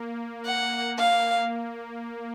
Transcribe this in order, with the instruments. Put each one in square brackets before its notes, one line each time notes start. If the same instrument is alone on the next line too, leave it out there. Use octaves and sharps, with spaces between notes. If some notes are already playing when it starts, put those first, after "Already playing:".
Already playing: [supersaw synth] A#3
[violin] F#5
F5